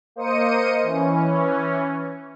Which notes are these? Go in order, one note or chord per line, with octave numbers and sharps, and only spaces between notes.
A#3 C5 D#5 D#6 C#7 D#7
E3 C#4